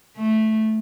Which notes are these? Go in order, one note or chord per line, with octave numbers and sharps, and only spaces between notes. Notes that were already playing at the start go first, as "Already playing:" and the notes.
A3